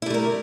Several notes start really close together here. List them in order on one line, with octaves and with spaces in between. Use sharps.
E4 G3 A3 A#4